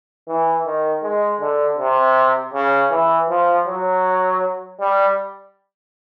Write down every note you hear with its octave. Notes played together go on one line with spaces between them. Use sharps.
E3
D#3
G#3
D3
C3
C#3
E3
F3
F#3
G3